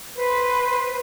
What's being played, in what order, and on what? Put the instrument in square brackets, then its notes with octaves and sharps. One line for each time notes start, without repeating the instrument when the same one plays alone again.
[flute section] B4 C5